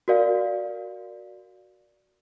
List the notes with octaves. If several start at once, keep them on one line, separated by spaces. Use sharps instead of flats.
F#4 A#4 D5 F5